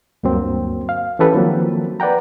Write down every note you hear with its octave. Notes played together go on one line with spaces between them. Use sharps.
D2 G2 F#3 A#3 C4
F5
E3 C#4 G4 A4 B4
D#3 F3 F#3 A#3 C4
B4 D5 F#5 G5 A#5